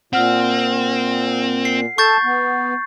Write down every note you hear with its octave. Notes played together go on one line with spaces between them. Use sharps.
A#2 C4 F#5 F6
C7
A4 A5 C#6 G6 A6
B3